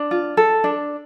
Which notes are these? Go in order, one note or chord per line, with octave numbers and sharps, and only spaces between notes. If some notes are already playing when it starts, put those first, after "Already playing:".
Already playing: D4
F4
A4
D4